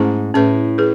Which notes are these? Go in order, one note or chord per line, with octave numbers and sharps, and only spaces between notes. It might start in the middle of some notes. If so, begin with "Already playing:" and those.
Already playing: G#2 A3 C#4 E4 G#4
A2 C#4 G#4 B4
G#4 B4